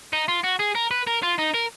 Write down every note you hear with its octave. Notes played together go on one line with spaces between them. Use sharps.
D#4
F4
F#4
G#4
A#4
B4
A#4
F4
D#4
A#4